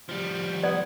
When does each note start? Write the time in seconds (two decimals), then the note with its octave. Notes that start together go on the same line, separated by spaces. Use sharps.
0.09 F3 G3
0.63 B3 D5